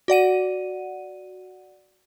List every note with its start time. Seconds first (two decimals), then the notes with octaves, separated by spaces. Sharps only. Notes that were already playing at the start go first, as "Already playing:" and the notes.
0.08 F#4 D5 F#5 D#7